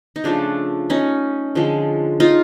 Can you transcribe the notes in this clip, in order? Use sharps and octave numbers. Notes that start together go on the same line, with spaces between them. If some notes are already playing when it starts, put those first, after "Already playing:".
D#4
C#3 F3 A3 D4
C#4 D#4
D3 F3 G#3
D#4 F4